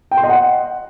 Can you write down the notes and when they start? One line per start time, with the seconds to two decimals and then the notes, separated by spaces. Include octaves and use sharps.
0.11 G5
0.17 C6
0.23 D#5
0.29 F#5